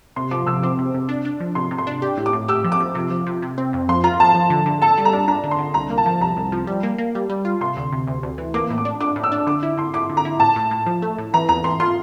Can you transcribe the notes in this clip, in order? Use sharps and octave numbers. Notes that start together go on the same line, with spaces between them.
C3 C6
F3 D6
C3 E6
C4 D6
C3
C3
D4
D4
F3
C3 C6
C3
C6
D4
G4
A2
D6
A2
G4 E6
F3
D6
F3
C3
F3
C3
C3
C4
F2
F3 C6
F4 A#5
F3 A5
F3
D3
D3
A4 A5
G3
A#5
D4
D4 A#5
D3
C6
D3
C2 A#5
A#3
A5
F3
C2 A#5
C2
F3
G3
A#3
A#3
G3
G3
F4
C3 C6
D2
C3
D2
D2
E3
A#3 D6
A2
D6
D4
D4 D6
A2
E6
D4
D3 D6
E4
D3 C6
E4 D6
D3
A#5
E4
A2 A5
A2
A2
F3
A3
A2
E3 A#5
E2 A#5
E3 C6
F4 C6